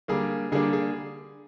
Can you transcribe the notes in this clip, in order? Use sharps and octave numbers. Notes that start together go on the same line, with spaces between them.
D3 G3 A#3 D4 G#4
D3 G3 A#3 D4 G#4
G#4